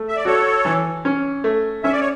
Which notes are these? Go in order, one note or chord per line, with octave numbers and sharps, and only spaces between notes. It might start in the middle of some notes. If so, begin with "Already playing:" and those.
Already playing: A3
E5
D5
F#4 A4 C#5
E3
C#4
A3
C#4 E5
D5
C#5